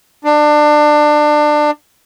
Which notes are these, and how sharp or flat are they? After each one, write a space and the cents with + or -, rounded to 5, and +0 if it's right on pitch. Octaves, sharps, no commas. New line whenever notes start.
D4 +25